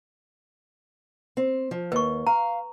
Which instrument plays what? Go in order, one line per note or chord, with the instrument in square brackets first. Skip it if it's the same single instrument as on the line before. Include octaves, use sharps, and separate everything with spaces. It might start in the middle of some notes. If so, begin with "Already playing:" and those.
[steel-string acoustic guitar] C4
F3
[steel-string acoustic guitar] D#2 [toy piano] B4 C#6
[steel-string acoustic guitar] F5 [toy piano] A#5